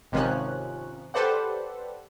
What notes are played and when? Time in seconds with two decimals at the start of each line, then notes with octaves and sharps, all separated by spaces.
0.12 G#1 C3 D#3 F3 C#4 F#6
1.14 G4 A4 B4 C5 D5 F#5